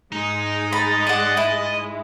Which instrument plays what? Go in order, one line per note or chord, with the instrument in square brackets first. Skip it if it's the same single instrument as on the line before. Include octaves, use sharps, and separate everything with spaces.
[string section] G#2 G#3 [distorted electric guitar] D#4
[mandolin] B5 [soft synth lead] A6
[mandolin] D4 F#5 [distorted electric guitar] D#5
[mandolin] E4